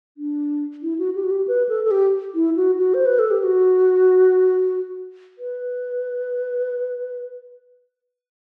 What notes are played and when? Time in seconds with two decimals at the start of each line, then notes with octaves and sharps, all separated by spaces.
0.17 D4
0.82 E4
0.99 F#4
1.15 G4
1.24 F#4
1.31 G4
1.47 B4
1.69 A4
1.84 A4
1.91 G4
2.35 E4
2.56 F#4
2.78 F#4
2.94 C5
3.06 B4
3.19 A4
3.31 G4
3.43 F#4
5.38 B4